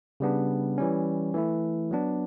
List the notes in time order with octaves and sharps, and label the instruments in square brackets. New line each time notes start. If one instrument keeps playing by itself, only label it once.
[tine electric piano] C#3 G3 B3 D4
E3 G3 C#4
E3 A3 E4
F#3 B3 D4